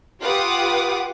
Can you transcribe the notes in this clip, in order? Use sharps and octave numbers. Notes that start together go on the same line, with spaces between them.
F4 G4 B4 F#5 D6 D#6